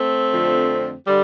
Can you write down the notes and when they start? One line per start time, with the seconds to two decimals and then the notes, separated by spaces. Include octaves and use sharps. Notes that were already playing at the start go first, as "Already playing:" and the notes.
Already playing: A3 C4
0.30 F2 D3 F3
1.06 D3 G3